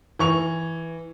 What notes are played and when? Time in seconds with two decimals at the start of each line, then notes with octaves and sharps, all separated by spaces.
0.19 E3 C#6 F7